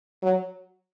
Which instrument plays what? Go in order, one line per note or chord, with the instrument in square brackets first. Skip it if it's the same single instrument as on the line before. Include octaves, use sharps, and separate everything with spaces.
[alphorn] F#3